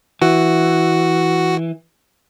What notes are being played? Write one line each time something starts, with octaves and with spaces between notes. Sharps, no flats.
E3 F#4